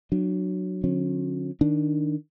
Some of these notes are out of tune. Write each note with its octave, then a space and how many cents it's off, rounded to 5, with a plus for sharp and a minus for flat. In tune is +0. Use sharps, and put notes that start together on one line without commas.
F#3 +0 D4 +30
D3 +0 F#3 -45 C#4 -40
D#3 +0 D4 +0